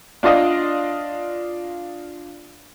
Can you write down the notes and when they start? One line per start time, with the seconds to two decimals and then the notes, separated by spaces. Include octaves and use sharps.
0.23 D4 F4 D5 D#5 F5